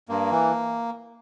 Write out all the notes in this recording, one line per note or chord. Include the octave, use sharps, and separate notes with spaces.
G2 A#3
E3